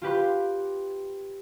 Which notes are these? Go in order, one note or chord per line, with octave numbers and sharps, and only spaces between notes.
F4 G4 B4 C6